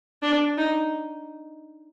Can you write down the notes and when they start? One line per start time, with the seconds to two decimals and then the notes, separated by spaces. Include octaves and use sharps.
0.22 D4
0.58 D#4